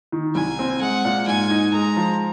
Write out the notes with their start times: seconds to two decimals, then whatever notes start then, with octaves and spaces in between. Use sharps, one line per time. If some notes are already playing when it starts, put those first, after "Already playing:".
0.12 D#3
0.35 C2 G#5
0.59 C4
0.81 G#3 F#5
1.05 A#2
1.27 G#2 G#5
1.50 D#4
1.73 G#3 A#5
1.97 F3